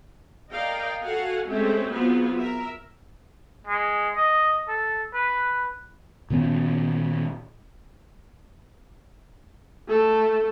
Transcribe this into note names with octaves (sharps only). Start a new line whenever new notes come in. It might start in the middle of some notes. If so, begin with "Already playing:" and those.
A#4 D5 D#5 F5 G5
F#4 A4 F5 F#5 G#5
G#3 A3 C4 C#4 G4 E5
F#3 B3 C4 F4 G#4
A#4 E5
G#3
D#5
A4
B4
A#2 D#3 B3 C#4
A3 A4